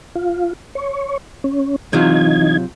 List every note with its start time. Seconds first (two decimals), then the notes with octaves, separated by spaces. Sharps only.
0.15 F4
0.75 C#5
1.44 C#4
1.93 C3 E3 F#3 D#4 F4 G#6